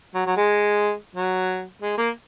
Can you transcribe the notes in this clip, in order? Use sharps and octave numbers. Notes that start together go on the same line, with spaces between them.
F#3
F#3
G#3
F#3
G#3
A#3